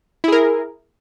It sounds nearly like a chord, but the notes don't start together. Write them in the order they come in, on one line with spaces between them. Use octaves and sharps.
E4 G#4 A#4